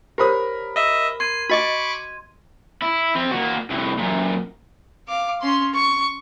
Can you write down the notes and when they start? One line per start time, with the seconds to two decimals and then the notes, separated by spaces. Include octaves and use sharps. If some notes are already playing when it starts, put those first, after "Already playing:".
0.18 G4 A#4 C5 C#5 B5 D#6
0.76 D#5 E5
1.20 C6 G#6 C7 D#7
1.49 F#4 D#5 B5 C#6 D6
2.82 E4
3.15 F3 C4
3.31 A#3 F#4
3.70 C2 A2
3.98 F#2 A#2
5.08 F5 D6
5.41 C#4 C6
5.74 C#6